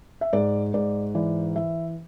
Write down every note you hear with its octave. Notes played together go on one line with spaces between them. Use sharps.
E5
G#2 D5
G#2 D5
E3 D5
E3 E5